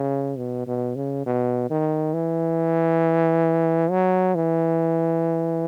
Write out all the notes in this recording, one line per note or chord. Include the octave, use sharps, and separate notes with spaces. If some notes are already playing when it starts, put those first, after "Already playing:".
Already playing: C#3
B2
B2
C#3
B2
D#3
E3
F#3
E3